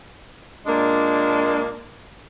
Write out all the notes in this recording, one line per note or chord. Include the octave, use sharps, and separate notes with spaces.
A#2 G#3 A#3 D4